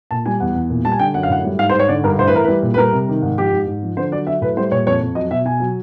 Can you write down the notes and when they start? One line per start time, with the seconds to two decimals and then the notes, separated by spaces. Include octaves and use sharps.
0.11 A#2 A5
0.26 G3 G#5
0.40 E2 F#5
0.55 E2
0.70 A#2
0.85 G3 A5
0.92 G#5
0.99 D3 G5
1.14 F#2 F#5
1.23 F5
1.29 A2 F#5
1.44 G3
1.59 G#2 F5
1.70 C5
1.74 G#2
1.79 C#5
1.88 D3 D5
2.04 G2 A#4
2.18 A2 C5
2.27 B4
2.33 E3 A#4
2.44 G3 B4
2.63 A#2
2.74 B4
2.78 G3 A#4
2.93 C3
3.08 D#3
3.22 G#2
3.37 F3 G4
3.52 G#2
3.67 G#2
3.83 F3
3.97 D3 C5
4.12 F#3 D5
4.27 F#3 E5
4.41 A2 B4
4.57 G3 C5
4.71 A#2 C#5
4.87 F2 C#5
5.01 F2
5.15 F#3 D#5
5.31 B2 E5
5.45 B2 G#5
5.60 F#3